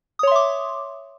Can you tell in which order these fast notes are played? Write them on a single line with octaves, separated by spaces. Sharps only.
D#6 C#5 C6 E5 D6